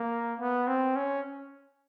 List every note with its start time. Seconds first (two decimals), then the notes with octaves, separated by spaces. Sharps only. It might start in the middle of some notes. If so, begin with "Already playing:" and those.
Already playing: A#3
0.40 B3
0.67 C4
0.96 C#4